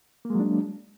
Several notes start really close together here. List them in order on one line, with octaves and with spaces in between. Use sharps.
A#3 G#3 F#3 D4